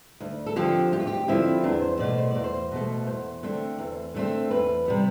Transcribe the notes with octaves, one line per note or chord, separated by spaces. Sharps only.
D2
A4
D3 F3 C4 G4
D2 G4
F4
G4
D3 F3 C4 E4
E2 D4
C5
B2 A3 D5
C5
E2 D5
C5
B2 A3
E2 C5
D3 A3 C4
E2
D3 A3 C4
E2 B4
C3 G3 B3